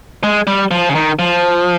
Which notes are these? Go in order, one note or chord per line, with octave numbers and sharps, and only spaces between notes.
G#3
G3
F3
C#3
D#3
F3